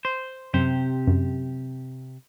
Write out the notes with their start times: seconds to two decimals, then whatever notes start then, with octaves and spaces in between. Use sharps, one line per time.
0.05 C5
0.54 F#2 C3 G4 C5
1.07 F#2